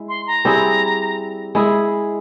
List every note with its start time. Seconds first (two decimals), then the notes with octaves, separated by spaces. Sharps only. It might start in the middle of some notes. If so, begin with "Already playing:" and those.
Already playing: G#3 E4
0.09 C6
0.27 A#5
0.45 G3 C4 E4 G#4
1.55 G#3 E4 G#4